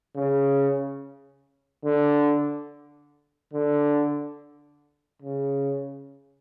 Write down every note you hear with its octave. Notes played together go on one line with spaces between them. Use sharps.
C#3
D3
D3
C#3